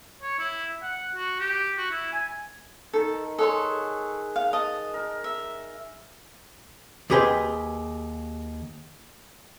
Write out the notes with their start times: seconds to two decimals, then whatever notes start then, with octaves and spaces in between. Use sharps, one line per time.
0.22 C#5
0.39 E4
0.83 F#5
1.15 F#4
1.40 G4
1.78 F#4
1.91 E4
2.12 G#5
2.93 D#3 A4
3.38 G#4 A4 C#5 F#5 C6
4.36 F5
4.53 D#5 A5
4.94 A#4
5.24 E5
7.10 D#2 G4 G#4 B4 G5 C6